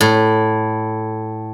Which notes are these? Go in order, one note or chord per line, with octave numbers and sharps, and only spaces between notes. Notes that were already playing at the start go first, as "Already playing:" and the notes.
A2